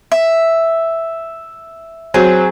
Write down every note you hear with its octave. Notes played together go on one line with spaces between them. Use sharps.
E5
F#3 C4 G#4